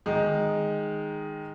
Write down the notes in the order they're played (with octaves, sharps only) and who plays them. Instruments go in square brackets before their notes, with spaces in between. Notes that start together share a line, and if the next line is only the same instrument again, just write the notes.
[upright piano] D#3 G#3 D#4